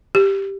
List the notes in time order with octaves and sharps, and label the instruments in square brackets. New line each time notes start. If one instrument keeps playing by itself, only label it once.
[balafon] G4